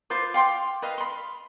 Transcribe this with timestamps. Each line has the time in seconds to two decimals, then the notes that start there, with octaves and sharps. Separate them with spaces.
0.10 F4 B4 C5 D6
0.34 F5 G5 C6 D6
0.82 B4 D#5 F5
0.98 B5 C6